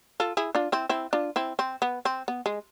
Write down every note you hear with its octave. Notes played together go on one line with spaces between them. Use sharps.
F4 A4
E4 G#4
D4 F4
C4 E4
C4 E4
D4 F4
C4 E4
C4
B3
C4
B3
G#3